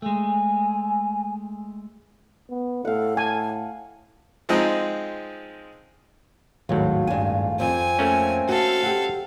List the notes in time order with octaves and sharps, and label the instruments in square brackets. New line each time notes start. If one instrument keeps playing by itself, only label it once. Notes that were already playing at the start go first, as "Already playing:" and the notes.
[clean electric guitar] G#3 A3 [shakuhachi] G#5
[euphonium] B3
[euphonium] A2 [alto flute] A4 [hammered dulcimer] F5 F#5
[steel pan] G#5 [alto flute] A5
[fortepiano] F3 G#3 C4 D#4
[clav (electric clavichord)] G#1 D#2 A2 [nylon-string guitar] F#3 [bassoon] F4
[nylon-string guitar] G2 G#5
[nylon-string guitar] F2 [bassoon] C4 [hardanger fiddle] G#5
[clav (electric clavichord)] A3 A#3 C#4
[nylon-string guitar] F#4 [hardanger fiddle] A4 F5
[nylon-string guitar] G4 F#5